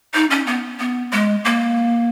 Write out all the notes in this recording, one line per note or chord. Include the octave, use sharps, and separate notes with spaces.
D#4
C#4
B3
B3
G#3
A#3